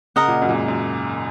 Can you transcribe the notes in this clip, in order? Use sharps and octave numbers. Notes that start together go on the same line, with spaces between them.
C#3 A#4 D#5 F#5
A#2
F#2
A#2
G#2
F#2